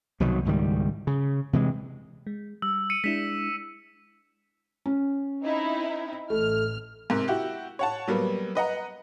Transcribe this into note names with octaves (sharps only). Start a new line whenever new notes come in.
C2 B2 D#3 F#3
C#2 G#2 D#3 G3
C#3
C3 E3 G#3
G#3
G3 E6
C#7 D#7
G#3 D4 E4 B6 E7
C#4
C4 D#4 E4
A1 A3 F6
G#2 C3 A#4
E4 F#4 G4
C#5 F#5 A5
F#3 G3 A#3 B3
B4 D#5 F#5 A#5